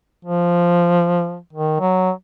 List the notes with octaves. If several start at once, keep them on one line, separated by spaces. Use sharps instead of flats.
F3
D#3
F#3